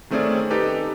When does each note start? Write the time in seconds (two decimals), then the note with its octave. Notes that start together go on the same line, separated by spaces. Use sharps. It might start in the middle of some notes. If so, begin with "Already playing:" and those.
0.10 D#3 A3 C4 C#4 G#4 D5
0.50 D#4 G4 A4 B4